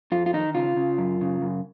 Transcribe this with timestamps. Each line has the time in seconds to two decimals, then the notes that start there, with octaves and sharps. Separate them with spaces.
0.12 F2 F4
0.26 F4
0.33 D#3 D#4
0.55 C#3 F4
0.76 C#3
0.98 F#2
1.21 C#3
1.42 F#2